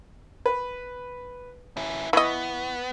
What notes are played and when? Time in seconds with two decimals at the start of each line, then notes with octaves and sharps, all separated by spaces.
0.46 B4
1.77 C#4 E4
2.13 E3 B3 D#5 B5 C#6